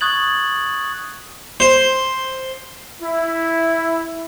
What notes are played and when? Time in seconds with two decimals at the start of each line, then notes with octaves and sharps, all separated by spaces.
0.01 C#6 D#6 F#6 G#6 A6 F#7
1.60 C5
3.01 E4